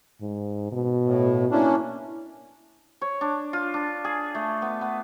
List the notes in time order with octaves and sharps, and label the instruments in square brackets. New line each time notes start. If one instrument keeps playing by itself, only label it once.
[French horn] G#2
B2
[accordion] A2
[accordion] A#3 C#4 D4 [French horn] E4
[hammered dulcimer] C#5
D4
F4
D4
G#4
A3
B3
B3